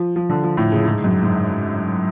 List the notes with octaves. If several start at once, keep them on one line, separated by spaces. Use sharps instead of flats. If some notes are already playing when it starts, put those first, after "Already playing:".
Already playing: F3
F3
D3
F3
A2
C#3
G#2
F#2
G#2